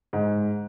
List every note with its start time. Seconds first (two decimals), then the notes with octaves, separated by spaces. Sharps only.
0.13 G#2